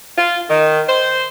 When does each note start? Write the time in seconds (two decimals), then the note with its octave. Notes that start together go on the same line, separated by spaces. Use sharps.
0.17 F4
0.50 D#3
0.88 C5